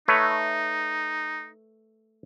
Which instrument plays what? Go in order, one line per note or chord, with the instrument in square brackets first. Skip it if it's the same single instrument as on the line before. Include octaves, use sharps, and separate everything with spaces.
[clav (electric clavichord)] A3 B4 C#5 [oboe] D#4